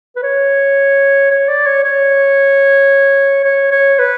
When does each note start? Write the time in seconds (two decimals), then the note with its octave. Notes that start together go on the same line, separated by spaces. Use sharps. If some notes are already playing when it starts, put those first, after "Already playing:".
0.16 B4
0.23 C#5
1.31 C#5
1.49 D5
1.66 C#5
1.84 C#5
3.45 C#5
3.71 C#5
3.99 B4